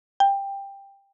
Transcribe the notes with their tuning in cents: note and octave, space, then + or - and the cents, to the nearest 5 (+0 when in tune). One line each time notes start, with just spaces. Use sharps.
G5 +15